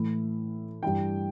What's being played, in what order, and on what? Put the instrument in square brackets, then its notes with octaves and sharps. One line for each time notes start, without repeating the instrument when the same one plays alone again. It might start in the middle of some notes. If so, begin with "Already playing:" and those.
Already playing: [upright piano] A2 E3 B5
G2 E3 G5